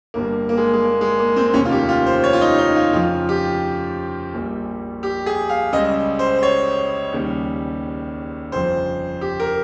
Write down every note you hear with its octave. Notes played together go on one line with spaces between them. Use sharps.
G1 G2 G3 A#3
A#3
G#3
G#3
A#3
G#3
A#3
C4
F1 D#2 D#3 C#4
F4
G4
F4
C5
C#5
F4
D#4
D#4
F4
F2 C#3 F3 F4
G4
A#1 A#2 G3
G4
G#4
F5
C#2 C#3 G3 D#5
C5
C5
C#5
D#2 C#3 G3
G1 F2 C#3 F3 C5
G4
A#4